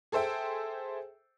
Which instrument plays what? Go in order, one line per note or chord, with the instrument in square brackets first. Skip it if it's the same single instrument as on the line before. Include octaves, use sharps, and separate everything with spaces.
[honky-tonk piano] G#4 A4 C5 E5 G5